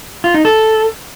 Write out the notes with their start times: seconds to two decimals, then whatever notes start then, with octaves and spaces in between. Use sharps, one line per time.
0.24 F4
0.34 D#4
0.45 A4